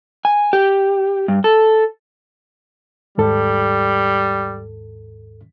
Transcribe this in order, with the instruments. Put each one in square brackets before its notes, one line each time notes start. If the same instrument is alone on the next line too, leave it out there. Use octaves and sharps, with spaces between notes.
[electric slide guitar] G#5
G4
G2
A4
[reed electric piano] D#2 G#2 A4 [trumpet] G3